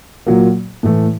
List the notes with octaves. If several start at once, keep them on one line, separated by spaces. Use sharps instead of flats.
A#2 F#3 A#3
A2 E3 A3